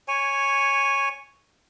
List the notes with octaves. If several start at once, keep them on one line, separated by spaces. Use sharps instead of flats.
C#5 G#5